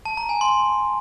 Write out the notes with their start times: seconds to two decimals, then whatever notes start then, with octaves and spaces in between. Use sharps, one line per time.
0.05 A5
0.17 A#5
0.29 G#5
0.41 C6